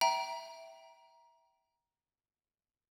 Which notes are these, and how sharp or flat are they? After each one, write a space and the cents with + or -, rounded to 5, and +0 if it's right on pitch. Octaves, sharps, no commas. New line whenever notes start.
E5 +0 G5 -25 A#5 +20